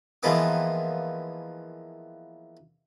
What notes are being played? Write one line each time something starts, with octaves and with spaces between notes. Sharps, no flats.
E3 F3 G#3 A#3 B3 D6